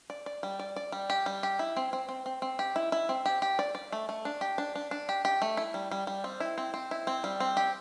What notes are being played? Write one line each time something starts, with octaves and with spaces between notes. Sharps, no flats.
D5
D5
G3
D5
D5
G3
G4
G3
G4
E4
C4
C4
C4
C4
C4
G4
E4
E4
C4
G4
G4
D5
D5
A3
A3
D4
G4
D4
D4
D4
G4
G4
A3
E4
G3
G3
G3
C4
E4
C4
C4
E4
C4
G3
C4
G4